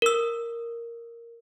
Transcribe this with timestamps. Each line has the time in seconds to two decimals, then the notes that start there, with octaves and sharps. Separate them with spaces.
0.02 A#4 E6